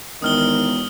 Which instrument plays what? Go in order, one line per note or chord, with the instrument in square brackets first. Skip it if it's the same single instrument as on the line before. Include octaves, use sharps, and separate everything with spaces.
[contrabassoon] E1 [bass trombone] D#3 [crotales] D#6 F6 G7